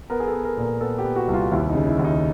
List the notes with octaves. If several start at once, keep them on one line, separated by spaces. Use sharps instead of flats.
B3 A#4
G#4
A4
B3
A#4
A#2
A#4
B3 A4
G4
B3
F#4
C2
F4
D#2 E4
D#4
C#3
E4
D#2
D#4